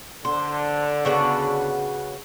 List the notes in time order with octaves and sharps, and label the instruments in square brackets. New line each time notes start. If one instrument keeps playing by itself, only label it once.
[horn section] D3 [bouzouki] C5
[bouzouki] C#3 B3 F#4